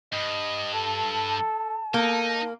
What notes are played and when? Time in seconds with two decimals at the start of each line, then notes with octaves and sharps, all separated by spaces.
0.12 G2 D#5
0.73 A4 A5
1.94 A#3 D#4 A4